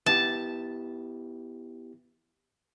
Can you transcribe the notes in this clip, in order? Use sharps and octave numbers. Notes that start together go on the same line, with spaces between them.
B3 E4 G4 A5